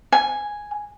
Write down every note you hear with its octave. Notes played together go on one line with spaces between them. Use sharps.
G#5